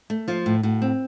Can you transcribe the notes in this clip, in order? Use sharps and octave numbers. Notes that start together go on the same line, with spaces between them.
A3
F3 F4
A2
A2 F#4
C4